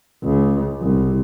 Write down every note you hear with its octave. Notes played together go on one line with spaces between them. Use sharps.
C#2
C2